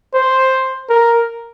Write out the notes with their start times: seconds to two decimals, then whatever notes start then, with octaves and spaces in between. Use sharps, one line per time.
0.14 C5
0.89 A#4